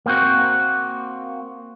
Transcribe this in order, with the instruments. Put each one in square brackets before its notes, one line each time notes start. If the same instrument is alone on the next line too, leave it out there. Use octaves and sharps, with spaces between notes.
[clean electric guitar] A#3 C4 F#4